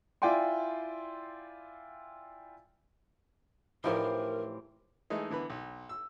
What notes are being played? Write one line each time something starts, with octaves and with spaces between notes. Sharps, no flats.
E4 F4 D5 G5 G#5 C6
A2 E3 F3 D#4 G4 A#4 C5
E3 G#3 A3 D#4
D3 E3 B3 B5
B1
E6